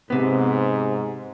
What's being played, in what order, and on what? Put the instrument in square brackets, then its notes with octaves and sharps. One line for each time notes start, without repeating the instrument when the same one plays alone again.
[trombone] G#2 [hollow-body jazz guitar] C3 B3